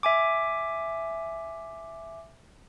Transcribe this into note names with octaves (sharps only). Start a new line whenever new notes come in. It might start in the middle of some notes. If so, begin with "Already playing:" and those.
E5 G#5 D6